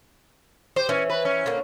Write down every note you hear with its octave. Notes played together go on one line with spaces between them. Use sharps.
G4 C5
E3 C#4
B4
C#4
D3 A#3